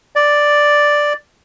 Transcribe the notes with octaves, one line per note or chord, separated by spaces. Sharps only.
D5